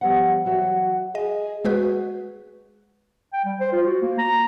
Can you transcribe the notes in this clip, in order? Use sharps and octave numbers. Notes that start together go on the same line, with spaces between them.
F3 G3 B3 F#5
E3 F#3 F#4 C#5 E5
G#4 D#5
G#3 F#4 G#4 B4
G5
G3
C5
F4
F#4
A#3
A#5